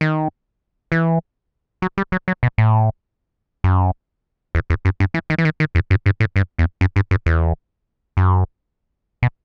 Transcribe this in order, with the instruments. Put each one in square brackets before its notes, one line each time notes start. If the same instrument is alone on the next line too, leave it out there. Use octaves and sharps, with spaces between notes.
[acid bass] D#3
E3
F#3
G3
F#3
F#3
B2
A2
F#2
E2
E2
F#2
G2
E3
D#3
E3
D#3
D#3
E2
F#2
G2
A2
G2
E2
F#2
G2
F#2
E2
F#2
B2